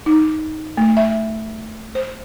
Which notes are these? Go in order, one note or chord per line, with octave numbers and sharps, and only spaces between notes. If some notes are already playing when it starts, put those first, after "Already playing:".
D#4
A3
E5
C5